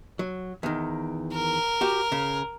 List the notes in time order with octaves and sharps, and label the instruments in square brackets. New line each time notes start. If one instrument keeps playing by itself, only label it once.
[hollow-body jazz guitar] F#3
E2 D#3
[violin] A#4
[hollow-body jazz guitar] F#4 G4
C#3